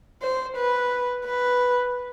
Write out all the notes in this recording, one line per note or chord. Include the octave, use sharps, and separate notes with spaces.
C5
B4
B4